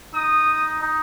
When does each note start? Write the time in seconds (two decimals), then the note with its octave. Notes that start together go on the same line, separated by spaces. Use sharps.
0.14 D#4 D#6
0.82 D#4